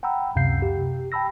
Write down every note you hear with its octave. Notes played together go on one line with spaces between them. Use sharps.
F#5 G5 A#5 B5 E6
C#2 F#2 C3 F5 G6 C7
G4
G5 A5 B5 E6 A#6